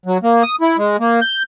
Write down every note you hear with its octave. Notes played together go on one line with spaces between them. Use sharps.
F#3
A#3
D#6
E4
G#3
A#3
G6